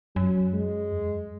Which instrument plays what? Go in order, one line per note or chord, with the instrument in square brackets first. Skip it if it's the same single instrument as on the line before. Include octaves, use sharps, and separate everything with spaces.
[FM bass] F#2 [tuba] F#3
[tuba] G#3
[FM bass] E2
F#2